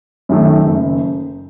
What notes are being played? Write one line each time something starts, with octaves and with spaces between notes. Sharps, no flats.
F#2 D#3 A3
F#1